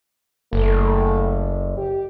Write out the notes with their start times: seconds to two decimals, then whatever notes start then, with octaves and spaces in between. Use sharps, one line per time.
0.53 F#1 A3
1.77 G4